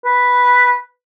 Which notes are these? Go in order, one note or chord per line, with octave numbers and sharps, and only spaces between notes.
B4